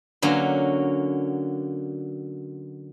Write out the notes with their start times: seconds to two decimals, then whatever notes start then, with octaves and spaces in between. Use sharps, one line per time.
0.22 D3 F#3 A#3 C#4